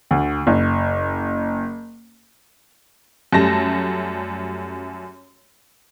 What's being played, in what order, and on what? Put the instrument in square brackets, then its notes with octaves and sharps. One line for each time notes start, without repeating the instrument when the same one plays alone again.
[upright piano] D2
F#1
[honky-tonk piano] F#2 G3 A3 A5 A#6